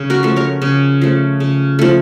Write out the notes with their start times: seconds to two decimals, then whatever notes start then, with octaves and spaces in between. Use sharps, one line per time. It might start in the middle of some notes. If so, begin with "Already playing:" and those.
Already playing: C#3
0.10 F#4 A#4
0.23 F3 A3
0.36 A#4 C#5
0.62 C#3
1.02 F3 A3
1.40 C#3
1.79 F3 A3